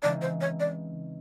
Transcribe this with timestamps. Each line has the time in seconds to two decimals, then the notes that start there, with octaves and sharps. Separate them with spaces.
0.03 C#3 E3 G#3 C4 D#4 D5
0.21 C5
0.41 C#5
0.60 D5